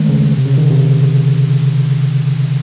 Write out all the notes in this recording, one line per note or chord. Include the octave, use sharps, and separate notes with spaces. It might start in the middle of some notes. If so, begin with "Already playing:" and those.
Already playing: D#3 G#3 A3
C#3
C3
C#3
D#3
C3